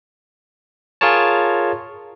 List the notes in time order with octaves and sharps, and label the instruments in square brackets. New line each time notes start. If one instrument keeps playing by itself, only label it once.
[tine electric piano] F4 G#4 A#4 C#5 A5